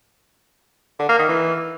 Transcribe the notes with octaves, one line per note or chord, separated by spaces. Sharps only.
D3
A#3
D#3
E3